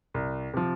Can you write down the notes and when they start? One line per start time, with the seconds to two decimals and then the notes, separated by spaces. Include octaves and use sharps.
0.14 C2
0.53 C3 F3